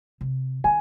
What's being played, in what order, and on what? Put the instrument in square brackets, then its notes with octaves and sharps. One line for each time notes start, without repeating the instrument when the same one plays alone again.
[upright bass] C3
[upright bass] D#3 [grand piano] G#5